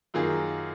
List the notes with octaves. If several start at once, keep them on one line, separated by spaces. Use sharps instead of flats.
F#2 D#3 A#3 F4 G#4